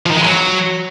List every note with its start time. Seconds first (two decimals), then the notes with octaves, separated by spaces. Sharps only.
0.06 F3
0.11 D#3
0.16 G#3
0.21 E3
0.26 F#3